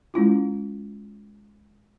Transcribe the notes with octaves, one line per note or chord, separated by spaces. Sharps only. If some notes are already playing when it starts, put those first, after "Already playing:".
G#3 C#4 E4 F4